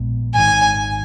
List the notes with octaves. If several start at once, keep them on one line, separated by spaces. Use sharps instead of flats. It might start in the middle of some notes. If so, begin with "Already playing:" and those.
Already playing: A#1 A#2 G#3 B3
G#1 G#2 D#3 G#5